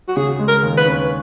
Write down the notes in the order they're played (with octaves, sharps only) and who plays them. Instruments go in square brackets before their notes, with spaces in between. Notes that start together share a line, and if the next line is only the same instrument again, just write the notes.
[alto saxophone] F#4
[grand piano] C#3 [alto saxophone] G#4
[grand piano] G#3
[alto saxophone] A#4
[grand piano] D#2
[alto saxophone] B4
[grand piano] C#4